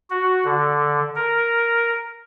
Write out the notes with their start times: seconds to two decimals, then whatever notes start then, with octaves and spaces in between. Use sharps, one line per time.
0.10 F#4
0.44 D3
1.16 A#4